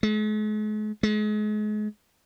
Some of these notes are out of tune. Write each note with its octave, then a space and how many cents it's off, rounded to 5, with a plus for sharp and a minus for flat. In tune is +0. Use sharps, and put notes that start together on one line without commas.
G#3 +45
G#3 +35